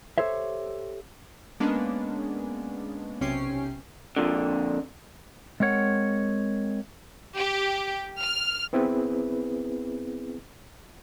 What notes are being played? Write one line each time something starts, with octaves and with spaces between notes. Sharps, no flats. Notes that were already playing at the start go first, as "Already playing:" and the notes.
G4 A4 C5 C#5 E5
G#3 A#3 B3 C#4 D4
B1 C3 C#4 G5 C7
F2 A#2 D3
G#3 C4 A#4 C#5 F#5
G4
F6
B3 C4 E4 G#4 B4